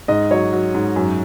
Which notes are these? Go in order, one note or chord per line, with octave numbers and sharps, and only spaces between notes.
G#2 D#5
F#3 C#5
F#3
G#2
F#2